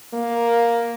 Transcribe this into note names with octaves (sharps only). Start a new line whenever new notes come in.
A#3